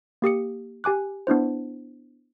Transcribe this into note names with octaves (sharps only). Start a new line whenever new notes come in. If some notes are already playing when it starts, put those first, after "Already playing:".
A#3 G4 D#6 C#7
G4 G#5 D6 F#6
B3 D4 E4 C5